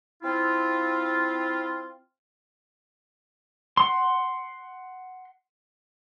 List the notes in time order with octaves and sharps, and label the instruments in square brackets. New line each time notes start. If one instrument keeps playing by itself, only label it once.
[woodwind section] C4 E4 F4
[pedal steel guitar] F#5 C6